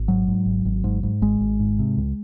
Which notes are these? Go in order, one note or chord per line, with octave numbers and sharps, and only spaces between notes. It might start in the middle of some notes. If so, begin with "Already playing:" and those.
Already playing: G#1
G#2 F#3
G#2
G#1
G#1
G#2
G#2
G#1 G#3
G#1
G#2
C3
C#2